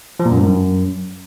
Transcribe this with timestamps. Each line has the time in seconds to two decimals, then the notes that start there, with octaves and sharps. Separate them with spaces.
0.20 F3
0.25 A#2
0.31 F#2
0.37 G2
0.43 F#2